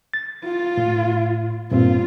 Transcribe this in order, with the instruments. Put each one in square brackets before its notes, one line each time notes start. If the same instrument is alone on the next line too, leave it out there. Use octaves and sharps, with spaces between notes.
[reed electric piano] A6
[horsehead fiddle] F4
[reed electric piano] A2
[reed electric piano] G2 A#2 C4 [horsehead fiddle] F4